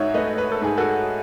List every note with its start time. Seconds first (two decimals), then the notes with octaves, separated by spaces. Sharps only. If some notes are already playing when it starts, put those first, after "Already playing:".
Already playing: G#2 D#4 F#4 C#5 E5
0.14 A3 B4 D#5
0.38 B4
0.52 A4
0.61 G#2 G#4
0.77 F#4 A4